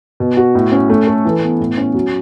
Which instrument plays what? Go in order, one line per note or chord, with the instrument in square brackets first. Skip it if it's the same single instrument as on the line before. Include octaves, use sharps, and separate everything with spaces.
[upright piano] B2
F#4
A2
C#4
A3
A4
E3
B3
A2
C#4
F#3